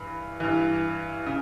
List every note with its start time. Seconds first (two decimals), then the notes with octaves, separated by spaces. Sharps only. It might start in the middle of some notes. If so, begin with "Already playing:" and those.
Already playing: G2 E3 B5
0.40 G2 E3
1.26 C#3